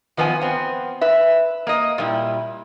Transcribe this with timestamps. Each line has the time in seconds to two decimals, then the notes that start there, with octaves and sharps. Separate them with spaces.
0.17 D#3 F3 B3 E5 G#5
0.41 B3 C4
1.01 B4 E5
1.67 A#3 D#5
1.98 A#2 G3 E4